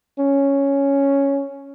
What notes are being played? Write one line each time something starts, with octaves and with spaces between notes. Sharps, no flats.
C#4